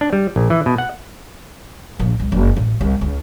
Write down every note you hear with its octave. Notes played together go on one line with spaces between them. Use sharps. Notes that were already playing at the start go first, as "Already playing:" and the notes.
D4
G3
A#1
E3
B2
F#5
A#1
C2
F#1
A1
C2
C#2